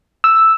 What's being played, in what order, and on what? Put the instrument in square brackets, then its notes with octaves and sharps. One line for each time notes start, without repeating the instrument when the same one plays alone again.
[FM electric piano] E6